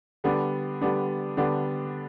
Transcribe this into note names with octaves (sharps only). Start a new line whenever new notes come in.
D3 G3 B3 D4
D3 G3 B3 D4
D3 G3 B3 D4